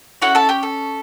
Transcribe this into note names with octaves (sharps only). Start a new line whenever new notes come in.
C#4 E4 F#4 A4 F#5
A4 A5
G4 G5
A4